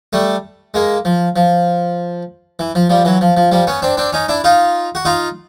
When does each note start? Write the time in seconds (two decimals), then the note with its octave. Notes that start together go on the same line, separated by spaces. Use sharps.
0.13 G3 A3
0.74 G#3 A#3
1.05 F3
1.36 F3
2.59 E3
2.75 F3
2.90 F3 G3
3.05 E3 F#3
3.21 F3
3.37 F3
3.52 F3 G3
3.67 B3 C#4
3.82 C4 D4
3.97 C4 D4
4.13 C#4 D#4
4.29 D4 E4
4.44 D#4 F4
4.95 F#4
5.05 D#4 F4